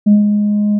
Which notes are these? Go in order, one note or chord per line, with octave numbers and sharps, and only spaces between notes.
G#3